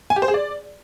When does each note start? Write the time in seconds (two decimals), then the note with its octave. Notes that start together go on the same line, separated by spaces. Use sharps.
0.10 G#5
0.16 G4
0.22 C5
0.28 G#4
0.34 D5